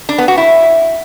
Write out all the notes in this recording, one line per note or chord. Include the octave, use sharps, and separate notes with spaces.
D4
B3
F#4
E4